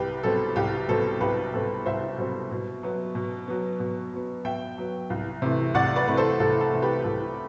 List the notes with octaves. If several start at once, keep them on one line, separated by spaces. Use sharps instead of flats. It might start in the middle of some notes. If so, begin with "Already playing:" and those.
Already playing: C2 G4 B4
B2 G3 C4 A4
C2 G4
B2 G3 C4 A4
C2 G4 B4
B2 G3 C4 A4
C2 C5 E5
B2 G3 C4
B2
F#3 B3
B2
F#3 B3
B2
F#3 B3
B2 E5 G5
F#3 B3
C2
C3 E3 A3
C2 D5 F#5
B4 D5
C3 E3 A3 B4
A4 C5
C2 A4
A4
C3 E3 A3
G4 B4
C2 A4